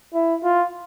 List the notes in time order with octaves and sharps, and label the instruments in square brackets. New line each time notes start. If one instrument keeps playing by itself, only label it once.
[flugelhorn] E4
F4